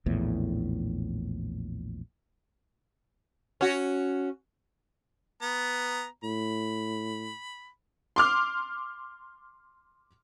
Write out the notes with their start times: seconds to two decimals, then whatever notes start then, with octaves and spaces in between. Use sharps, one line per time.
0.06 A#1 E2 A2
3.61 C#4 F#4
5.42 B3 A#5
6.24 A2 B5
8.16 C6 D6 F6